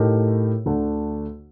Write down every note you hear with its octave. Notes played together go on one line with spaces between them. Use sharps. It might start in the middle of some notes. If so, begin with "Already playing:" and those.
Already playing: A2 A3 D#4 G4 A#4
D2 D3 A3 D4